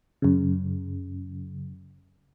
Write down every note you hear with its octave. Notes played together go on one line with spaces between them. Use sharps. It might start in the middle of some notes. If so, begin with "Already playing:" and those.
F#2 C#3